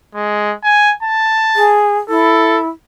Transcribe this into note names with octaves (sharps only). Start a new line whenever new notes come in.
G#3
G#5
A5
G#4
E4 A4